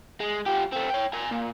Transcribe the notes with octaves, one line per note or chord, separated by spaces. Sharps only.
G#3
F3 G4
A3 C4
C#5 G5
A#4 G#5
A#2